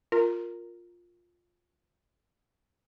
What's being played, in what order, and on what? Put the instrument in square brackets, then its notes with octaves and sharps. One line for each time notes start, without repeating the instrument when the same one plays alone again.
[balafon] F4 [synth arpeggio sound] A#4